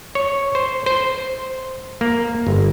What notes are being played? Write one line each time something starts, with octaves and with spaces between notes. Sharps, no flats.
C#5
C5
C5
A#3
G1